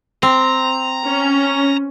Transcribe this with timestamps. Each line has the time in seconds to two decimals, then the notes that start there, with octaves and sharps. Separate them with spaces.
0.23 C4 A#5
1.04 C#4